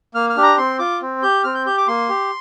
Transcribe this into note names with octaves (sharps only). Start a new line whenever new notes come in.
A#3 F6
F6
D4 G4
A#5
C4 C6
F4 D6
C4
G4 G6
C4 F6
G6
G4 G6
D6
A#3 C6
G4